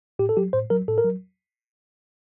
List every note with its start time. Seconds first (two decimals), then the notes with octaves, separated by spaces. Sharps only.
0.19 A2 G4
0.29 A4
0.37 F#3 G4
0.53 A2 C5
0.70 F#3 A#4
0.88 A2 A4
0.98 A#4
1.05 F#3